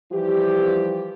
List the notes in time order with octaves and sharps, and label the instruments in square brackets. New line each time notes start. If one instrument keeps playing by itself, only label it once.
[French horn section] E3 F3 G3 G4